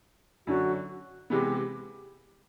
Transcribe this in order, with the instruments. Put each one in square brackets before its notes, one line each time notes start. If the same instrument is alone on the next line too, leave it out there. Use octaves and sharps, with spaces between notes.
[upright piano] F#2 D3 F#3 [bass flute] F#4
[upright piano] C3 E3 G#3 B3 [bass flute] G4